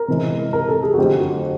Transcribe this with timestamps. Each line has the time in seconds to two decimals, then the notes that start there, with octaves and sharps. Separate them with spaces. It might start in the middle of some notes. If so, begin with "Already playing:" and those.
Already playing: A#4
0.08 C3 E3 G#3
0.53 A#4
0.68 A4
0.83 G#4
0.94 F#4
0.98 F2 D3 F#3 A3 G4
1.20 F#4